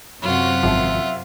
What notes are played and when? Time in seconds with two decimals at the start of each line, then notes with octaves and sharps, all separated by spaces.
0.22 F#2 C3 F4 F#4 F#5
0.63 G#1 F3 E5